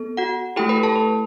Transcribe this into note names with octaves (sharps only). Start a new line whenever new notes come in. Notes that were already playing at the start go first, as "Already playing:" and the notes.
Already playing: B3 A4
F#4 F#5
A3 E4 G4 A4 G5
B4 B5
A4 A5
B4